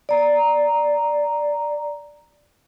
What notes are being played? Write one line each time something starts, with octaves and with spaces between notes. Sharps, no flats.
D5 A#5